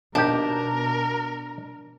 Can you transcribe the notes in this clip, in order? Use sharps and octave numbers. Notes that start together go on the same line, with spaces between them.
A#1 D#2 B2 D4 G4 A#4